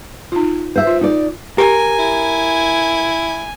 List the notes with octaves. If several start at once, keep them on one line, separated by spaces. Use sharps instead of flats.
D#4 F4
C5 E5
F4
D#4 D5
G4 A#4 G#5
E4